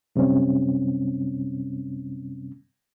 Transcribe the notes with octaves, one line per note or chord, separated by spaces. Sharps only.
F#2 C3 G3 C4 C#4